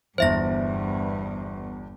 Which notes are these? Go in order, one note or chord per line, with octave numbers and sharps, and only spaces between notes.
G1 E2 G2 C5 E5 A#6